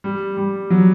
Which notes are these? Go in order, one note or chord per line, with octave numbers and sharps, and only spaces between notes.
G3
G3
F#3